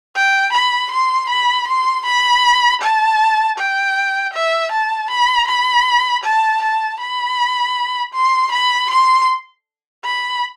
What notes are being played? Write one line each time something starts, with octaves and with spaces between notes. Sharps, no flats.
G5
B5
C6
B5
C6
B5
A5
G5
E5
A5
B5
B5
A5
A5
B5
C6
B5
C6
B5